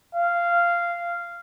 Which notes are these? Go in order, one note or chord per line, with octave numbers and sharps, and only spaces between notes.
F5